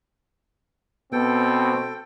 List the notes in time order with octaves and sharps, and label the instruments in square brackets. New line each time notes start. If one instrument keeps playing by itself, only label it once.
[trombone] B2 [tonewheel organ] B3 [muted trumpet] C4 [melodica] A4 G5